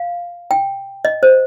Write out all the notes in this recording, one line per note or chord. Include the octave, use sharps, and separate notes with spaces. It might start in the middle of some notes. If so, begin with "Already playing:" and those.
Already playing: F5
G5
D#5
C5